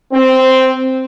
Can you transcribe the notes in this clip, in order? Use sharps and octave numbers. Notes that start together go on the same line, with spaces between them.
C4